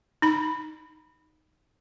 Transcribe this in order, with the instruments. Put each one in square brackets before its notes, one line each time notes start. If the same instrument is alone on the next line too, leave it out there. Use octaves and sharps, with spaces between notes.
[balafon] D#4 B5